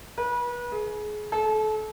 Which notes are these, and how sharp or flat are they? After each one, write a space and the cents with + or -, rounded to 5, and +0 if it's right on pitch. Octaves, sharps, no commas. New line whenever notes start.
B4 -30
G#4 +25
A4 -30